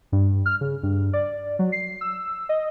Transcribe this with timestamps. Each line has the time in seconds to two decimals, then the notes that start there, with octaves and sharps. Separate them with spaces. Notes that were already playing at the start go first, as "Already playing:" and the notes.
0.12 G2
0.46 F6
0.61 C#3
0.83 G2
1.13 D5
1.59 F#3
1.72 C7
2.01 E6
2.49 D#5